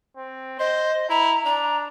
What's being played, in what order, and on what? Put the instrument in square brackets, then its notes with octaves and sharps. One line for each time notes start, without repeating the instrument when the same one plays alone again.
[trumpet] C4
[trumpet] C5 [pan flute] D#5
[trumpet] E4 [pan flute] A#5
[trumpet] D4 [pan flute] A#5